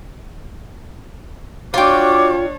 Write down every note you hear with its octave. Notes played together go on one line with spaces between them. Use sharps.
D4 F4 F#4 C#5 G5 D6